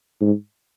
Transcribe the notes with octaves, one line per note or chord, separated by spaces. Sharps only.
G#2